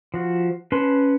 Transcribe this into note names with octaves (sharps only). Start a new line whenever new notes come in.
F3 F#4
C#4 B4 A5 B5 C6